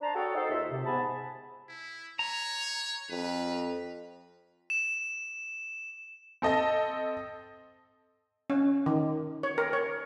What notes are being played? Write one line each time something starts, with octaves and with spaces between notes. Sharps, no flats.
D4 C5 A5 A#5
F#4 G#4 A4 C#5 G5
D#4 G#4 A4 C5
D#2 F4 D#5 E5
C3
G#2 B3 G#5 A5 B5
E4
C#5 A#5
F2 B4
E7
C4 A4 D#5 A5 A#6
C#4
D#3
C#5
A#4
C#5